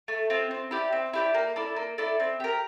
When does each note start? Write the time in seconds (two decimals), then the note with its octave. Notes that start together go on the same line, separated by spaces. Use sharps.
0.08 A3
0.30 C4 F4
0.51 C4
0.71 E4 G4 D5
0.92 C4
1.13 E4 G4 D5
1.34 A#3
1.56 E4 A4 D5
1.76 A#3
1.98 E4 A4 D5
2.20 C4
2.40 G4 A#4